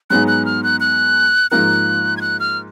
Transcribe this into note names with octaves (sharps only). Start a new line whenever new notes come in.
G#2 F#3 B3 D#4 G#4 F#6
F#6
F6
F#6
F#6
G#2 F3 A#3 D#4 A#4 F#6
G#6
F#6
F6